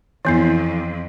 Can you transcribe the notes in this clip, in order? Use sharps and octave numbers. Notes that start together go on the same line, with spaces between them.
F2 E3 B3 E4